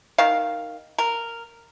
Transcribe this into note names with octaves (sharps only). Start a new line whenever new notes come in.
D#3 F5
A#4